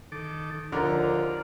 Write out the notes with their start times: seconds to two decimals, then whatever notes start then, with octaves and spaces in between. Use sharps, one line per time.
0.12 D#3 A4 D6
0.72 D#2 D3 F3 F4 D5 A#5